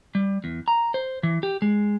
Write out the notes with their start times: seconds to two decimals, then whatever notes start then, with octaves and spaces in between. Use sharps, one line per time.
0.15 G3
0.44 E2
0.68 A#5
0.94 C5
1.23 E3
1.43 G4
1.62 G#3